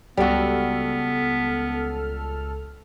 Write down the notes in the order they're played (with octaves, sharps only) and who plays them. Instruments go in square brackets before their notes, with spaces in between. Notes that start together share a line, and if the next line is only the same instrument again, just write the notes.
[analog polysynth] C#2 A4 F6 [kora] G3 F#4 [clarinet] B3